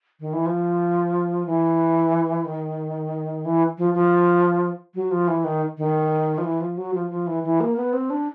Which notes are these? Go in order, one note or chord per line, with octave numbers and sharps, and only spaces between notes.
D#3
E3
F3
E3
D#3
E3
F3
F3
F#3
F3
E3
D#3
D#3
F3
E3
F3
F#3
F3
F3
E3
E3
A#3
B3
C4
D4